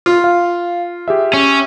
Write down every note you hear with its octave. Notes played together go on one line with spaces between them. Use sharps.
F4
F5
G4 G#4 E5
C#4